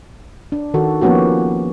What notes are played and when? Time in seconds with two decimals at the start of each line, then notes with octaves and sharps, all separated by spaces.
0.52 D4
0.74 D#3 F#4 A4
1.01 F3 A#3 B3 C#4 F#4 G4